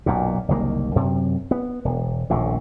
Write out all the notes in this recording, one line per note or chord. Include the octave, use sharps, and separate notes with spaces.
B1 F#2 A#2
F#1 C2 D#3 A#3
F#2 C3
B3
E1
D#1 A#1 A2